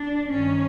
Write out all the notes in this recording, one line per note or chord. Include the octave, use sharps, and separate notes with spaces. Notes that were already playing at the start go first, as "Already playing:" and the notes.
Already playing: D4
G2 D#3 C#4